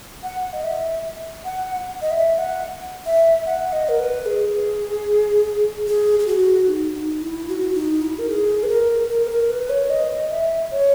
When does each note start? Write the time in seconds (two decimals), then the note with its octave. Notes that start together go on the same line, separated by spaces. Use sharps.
0.23 F#5
0.53 D#5
0.64 E5
1.45 F#5
2.02 D#5
2.11 E5
2.38 F#5
3.06 E5
3.46 F#5
3.73 D#5
3.89 A#4
3.99 B4
4.26 G#4
5.87 G#4
6.19 G#4
6.27 F#4
6.68 D#4
6.94 D#4
7.22 E4
7.49 F#4
7.74 D#4
8.02 E4
8.19 A#4
8.29 G#4
8.63 B4
8.69 A#4
9.09 A#4
9.25 B4
9.30 A#4
9.49 B4
9.70 C#5
9.90 D#5
10.30 E5
10.71 C#5